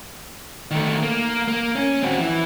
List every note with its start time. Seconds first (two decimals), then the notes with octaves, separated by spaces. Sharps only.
0.71 D#3 A3
1.03 A#3
1.48 A#3
1.76 C#4
2.03 C4 F#4
2.19 E3